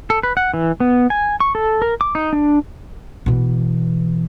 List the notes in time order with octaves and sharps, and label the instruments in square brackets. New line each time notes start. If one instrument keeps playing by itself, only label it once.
[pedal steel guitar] A4
B4
F#5
E3
B3
G#5
C#6
A4
A#4
D6
D#4
D4
[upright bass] B2 E3